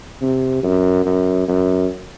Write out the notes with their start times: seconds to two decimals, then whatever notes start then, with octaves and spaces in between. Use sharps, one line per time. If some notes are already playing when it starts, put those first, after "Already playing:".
0.21 C3
0.63 F#2
1.05 F#2
1.48 F#2